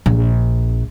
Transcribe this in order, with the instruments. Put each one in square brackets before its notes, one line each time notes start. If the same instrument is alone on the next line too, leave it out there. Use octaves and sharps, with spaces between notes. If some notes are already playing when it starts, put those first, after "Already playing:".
[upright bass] A#1